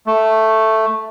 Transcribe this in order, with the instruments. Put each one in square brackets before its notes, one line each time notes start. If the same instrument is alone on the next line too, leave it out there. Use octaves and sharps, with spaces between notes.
[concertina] A3